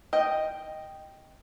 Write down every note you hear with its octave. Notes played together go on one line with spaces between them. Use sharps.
D#5 G5